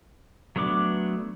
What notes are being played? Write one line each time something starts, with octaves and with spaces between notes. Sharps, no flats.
F#3 A3 B3 D4 D6